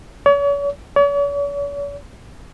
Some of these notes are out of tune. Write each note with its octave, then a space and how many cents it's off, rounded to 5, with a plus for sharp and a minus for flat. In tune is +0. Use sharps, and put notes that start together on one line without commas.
C#5 +40
C#5 +45